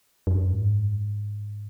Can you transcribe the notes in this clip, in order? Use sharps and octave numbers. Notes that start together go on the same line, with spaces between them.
F#2
G#2